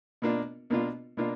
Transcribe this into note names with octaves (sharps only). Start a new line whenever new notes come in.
B2 A#3 D4 F4
B2 A#3 D4 F4
B2 A#3 D4 F4